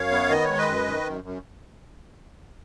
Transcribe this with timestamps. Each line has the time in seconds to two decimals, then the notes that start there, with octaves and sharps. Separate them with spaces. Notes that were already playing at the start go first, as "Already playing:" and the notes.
Already playing: F#2 C#5 F5
0.11 B3
0.30 D#3 D#5
0.44 G#3 C#5
0.58 B4 D#5
0.68 F#2
0.87 D#3
1.06 F#2
1.24 F#2